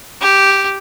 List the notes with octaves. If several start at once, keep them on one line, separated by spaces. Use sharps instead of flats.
G4